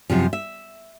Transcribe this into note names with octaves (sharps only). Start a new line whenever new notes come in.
F#2 C3 F3
E5